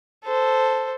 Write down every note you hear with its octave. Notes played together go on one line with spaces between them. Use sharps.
A4 C5